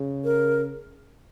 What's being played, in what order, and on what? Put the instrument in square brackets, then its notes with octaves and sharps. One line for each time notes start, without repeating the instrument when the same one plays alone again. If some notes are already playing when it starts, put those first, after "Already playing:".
Already playing: [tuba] C#3
[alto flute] A#4